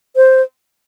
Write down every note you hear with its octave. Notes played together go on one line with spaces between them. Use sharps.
C5